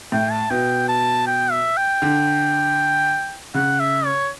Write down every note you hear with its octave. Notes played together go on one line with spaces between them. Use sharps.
A2 G5
A5
B2 G5
A5
G5
E5
G5
D3
C#3 F#5
E5
C#5